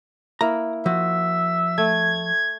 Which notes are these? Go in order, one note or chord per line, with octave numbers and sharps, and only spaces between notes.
A#3 E4 A#4 A#5
F3 F#4 E5
A3 G#6